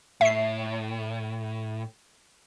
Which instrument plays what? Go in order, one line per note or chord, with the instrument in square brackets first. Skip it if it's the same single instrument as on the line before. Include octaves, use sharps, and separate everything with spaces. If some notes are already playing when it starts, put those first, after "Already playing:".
[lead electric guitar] A2 [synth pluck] E5 C7